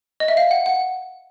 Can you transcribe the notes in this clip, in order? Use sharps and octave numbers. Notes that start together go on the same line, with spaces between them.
D#5
E5
F5
F#5
F#5